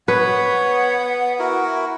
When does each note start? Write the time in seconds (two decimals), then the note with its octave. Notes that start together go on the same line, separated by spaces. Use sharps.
0.08 B3 B4 C#5 F#5
1.39 E4 F#4 A#4